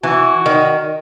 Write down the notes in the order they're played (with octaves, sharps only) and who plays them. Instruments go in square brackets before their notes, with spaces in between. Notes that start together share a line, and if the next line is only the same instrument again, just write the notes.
[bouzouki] E3 [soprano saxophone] F#4
[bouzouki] D#3